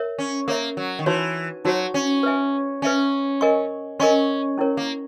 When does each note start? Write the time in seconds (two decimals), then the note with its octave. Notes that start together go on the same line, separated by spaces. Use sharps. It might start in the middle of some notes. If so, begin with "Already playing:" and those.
Already playing: A#4 C#5 E5
0.19 C#4
0.48 A#3 A#4 C#5 E5
0.77 F#3
0.99 D#3
1.06 E3 D#4 F#4 C#5
1.65 F#3 D#4 F#4 C#5
1.94 C#4
2.23 B4 E5 G#5
2.82 C#4 B4 E5 G#5
3.41 A#4 D#5 G#5 C#6
4.00 C#4 A#4 D#5 G#5 C#6
4.58 C#4 E4 A#4 C#5
4.77 A#3